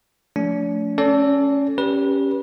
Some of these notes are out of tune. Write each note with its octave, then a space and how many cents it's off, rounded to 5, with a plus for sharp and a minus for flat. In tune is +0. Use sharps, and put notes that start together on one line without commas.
F3 +20 A3 +0 D4 -45
C#4 +0 A4 +0 D5 -35
C#4 +0 G4 +0 B4 -25